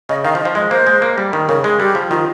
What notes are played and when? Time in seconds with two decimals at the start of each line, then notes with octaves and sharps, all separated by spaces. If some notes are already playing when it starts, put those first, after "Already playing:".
0.09 C#3 D#5
0.24 D#3 F5
0.35 F3
0.40 D#5
0.45 F3
0.55 G#3 D#5
0.71 A#3 C5
0.87 G#3
1.02 A#3
1.18 G3
1.33 D#3
1.48 C#3 A#4
1.64 G#3 G#4
1.80 G3 G4
1.95 F3
2.11 D#3 F4